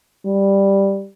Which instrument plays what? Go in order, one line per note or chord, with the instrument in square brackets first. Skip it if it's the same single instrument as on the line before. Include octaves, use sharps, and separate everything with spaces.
[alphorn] G3